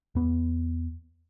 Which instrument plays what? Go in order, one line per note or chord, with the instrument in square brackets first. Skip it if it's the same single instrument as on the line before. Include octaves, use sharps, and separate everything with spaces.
[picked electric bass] E2 B3